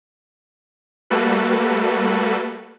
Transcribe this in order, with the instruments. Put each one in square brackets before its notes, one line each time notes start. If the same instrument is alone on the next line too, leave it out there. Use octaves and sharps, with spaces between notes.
[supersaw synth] G3 A3 A#3 F#4 A4 B4